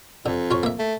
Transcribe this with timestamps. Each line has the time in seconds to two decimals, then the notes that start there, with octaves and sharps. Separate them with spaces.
0.26 F2 D3
0.51 F4 C#5
0.63 A#3 E5
0.79 A3